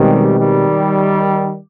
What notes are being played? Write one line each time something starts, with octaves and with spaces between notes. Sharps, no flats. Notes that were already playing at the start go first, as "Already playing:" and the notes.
Already playing: B2 D#3 G3 G#3 C4 G4
D#3 G3